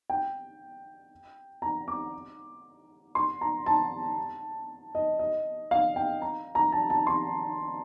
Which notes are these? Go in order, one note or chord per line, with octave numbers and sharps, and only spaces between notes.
G5
A#5
D6
C6
A#5
A5
D#5
D#5
F5
G5
A#5
A#5
A5
A5
C6